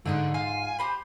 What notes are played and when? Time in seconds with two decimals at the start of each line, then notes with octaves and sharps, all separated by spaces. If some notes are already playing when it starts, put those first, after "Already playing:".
0.06 G#2 D3 A3 D#6 F#6
0.34 F4 F5 G#5 F6
0.79 G4 C5 B5